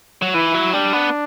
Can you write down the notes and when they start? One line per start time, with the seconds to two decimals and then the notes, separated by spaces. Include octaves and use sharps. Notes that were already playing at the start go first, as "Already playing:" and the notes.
0.22 F#3
0.34 E3 E4
0.54 F#3
0.73 G3 D4
0.93 B3